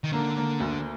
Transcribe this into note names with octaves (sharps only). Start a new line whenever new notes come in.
D#3
D3 A#3
A#3
D2